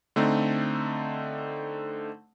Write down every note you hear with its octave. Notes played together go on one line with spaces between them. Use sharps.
D3 A3 C4 D#4